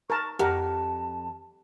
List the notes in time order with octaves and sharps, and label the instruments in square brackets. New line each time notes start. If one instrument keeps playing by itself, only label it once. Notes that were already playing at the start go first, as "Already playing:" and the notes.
[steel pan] A#4 A5 [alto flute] C#6
[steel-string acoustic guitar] F2 [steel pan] G4 A#4 F#5 [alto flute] A5